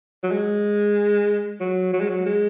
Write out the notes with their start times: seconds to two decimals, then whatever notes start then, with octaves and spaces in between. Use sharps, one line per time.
0.23 F#3
0.31 G#3
1.60 F#3
1.93 F#3
2.01 G#3
2.09 F#3
2.26 G#3